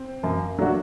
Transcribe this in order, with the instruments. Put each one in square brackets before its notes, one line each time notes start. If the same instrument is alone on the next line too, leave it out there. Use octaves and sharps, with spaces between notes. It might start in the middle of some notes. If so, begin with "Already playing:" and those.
Already playing: [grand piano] C4
[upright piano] F#2 [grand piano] A#3
[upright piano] F#3 A3 D4 F#4